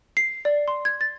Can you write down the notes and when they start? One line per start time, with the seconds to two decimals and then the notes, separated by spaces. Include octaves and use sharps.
0.17 C7
0.45 D5
0.68 C6
0.85 G#6
1.01 A6